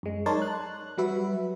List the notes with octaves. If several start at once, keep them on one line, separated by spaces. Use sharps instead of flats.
F#2 G#3
D#4 A#4 C#5 D5 A5 C6
F#6
F#3 G3 F#4 B4 E5